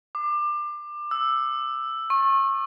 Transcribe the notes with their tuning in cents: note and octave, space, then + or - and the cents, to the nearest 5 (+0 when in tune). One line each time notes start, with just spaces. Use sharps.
D6 +25
E6 +5
C#6 -30